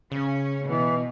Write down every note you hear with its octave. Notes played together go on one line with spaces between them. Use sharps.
C#3 C#4
B2 E3